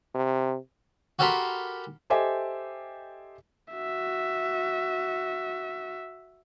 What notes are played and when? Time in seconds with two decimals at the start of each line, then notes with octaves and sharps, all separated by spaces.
0.15 C3
1.19 F#4 G4 A4 A#4 B5 C6
2.10 G4 A4 C5 D#5 E5 G#5
3.73 F#4 E5